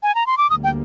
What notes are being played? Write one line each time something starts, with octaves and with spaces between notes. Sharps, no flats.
G#5
A#5
C6
D6
D2 D3 G3 A#3 D#6
G5